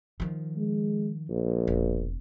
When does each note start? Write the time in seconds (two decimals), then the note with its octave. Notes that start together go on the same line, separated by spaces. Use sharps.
0.20 D#3 F3
0.57 G#3
1.30 A#1
1.67 E1